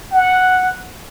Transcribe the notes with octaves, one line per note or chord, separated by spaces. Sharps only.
F#5